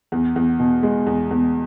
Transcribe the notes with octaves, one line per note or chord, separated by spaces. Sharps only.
E2
E2
B2
G#3
E2
E2